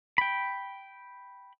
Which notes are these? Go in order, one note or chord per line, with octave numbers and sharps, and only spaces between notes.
G5 B5